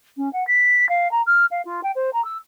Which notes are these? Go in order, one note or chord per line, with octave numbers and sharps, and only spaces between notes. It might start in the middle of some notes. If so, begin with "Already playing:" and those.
C#4
F#5
B6
F5
A#5
F6
F5
F4
G5
C5
A#5
E6